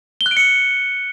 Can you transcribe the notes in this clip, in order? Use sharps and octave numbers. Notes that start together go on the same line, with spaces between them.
G7
F#6
D7
C#7